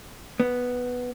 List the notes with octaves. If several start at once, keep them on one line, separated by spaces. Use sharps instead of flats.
B3